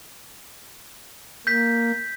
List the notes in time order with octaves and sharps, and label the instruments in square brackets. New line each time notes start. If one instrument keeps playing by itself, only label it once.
[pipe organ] A#3 [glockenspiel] G6 B6